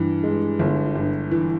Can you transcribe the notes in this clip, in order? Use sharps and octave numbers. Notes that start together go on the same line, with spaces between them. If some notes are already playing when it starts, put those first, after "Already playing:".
Already playing: G2 E3
G#3
G1
G2
E3